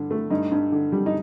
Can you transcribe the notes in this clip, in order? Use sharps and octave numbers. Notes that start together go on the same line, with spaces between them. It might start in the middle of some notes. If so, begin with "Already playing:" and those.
Already playing: G2 D3
A3
G2 D#4
G2
D3
G3
D#4